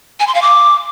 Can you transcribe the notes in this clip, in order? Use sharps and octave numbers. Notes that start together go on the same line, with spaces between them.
G#5
C6
F5
D6